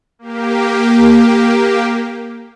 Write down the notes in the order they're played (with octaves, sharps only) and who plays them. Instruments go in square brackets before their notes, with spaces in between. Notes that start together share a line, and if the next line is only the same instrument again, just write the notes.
[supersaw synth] A#3 G4